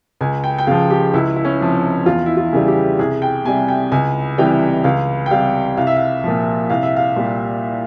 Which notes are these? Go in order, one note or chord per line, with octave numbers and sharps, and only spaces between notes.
C#2 G#5
G5
G5
C#3 F3 F5
G4
C#2 E4
E4
C#4
C3 F3
E2 F4
E4
F4
C#3 E3 G3
G4
C2 G#4
G5
C3 G3 G#5
G5
C#2 G#5
C3 E3 G3 G5
C#2 F5
G5
C3 G3 F5
C2 F5
E5
F5
A#2 F3
C2 F5
E5
F5
A#2 G3